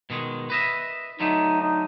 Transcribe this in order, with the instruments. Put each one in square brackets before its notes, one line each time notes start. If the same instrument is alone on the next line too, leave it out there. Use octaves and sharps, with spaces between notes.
[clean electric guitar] B2 D#3 G#3
B4 D#5 E5
[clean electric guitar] D3 F#3 A3 [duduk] D#4
[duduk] D#4